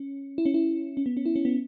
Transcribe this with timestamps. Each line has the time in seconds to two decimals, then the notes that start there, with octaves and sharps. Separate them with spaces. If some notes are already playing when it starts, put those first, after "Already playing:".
Already playing: C#4
0.38 E4
0.45 C#4
0.54 E4
0.97 C#4
1.06 B3
1.17 C#4
1.25 E4
1.36 C#4
1.45 B3